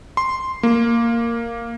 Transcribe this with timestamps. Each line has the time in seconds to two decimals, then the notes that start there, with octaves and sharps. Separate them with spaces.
0.17 C6
0.63 A#3